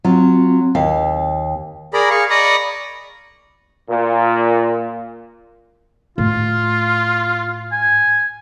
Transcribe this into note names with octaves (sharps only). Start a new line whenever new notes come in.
F#3 C4 F4
D#2 F5 G5
G#4 A#4 D5 A#5 B5
G#4 F5 C#6
D5 D#5 A#5 B5 C#6 D#6
A#2
A2 F4
G#5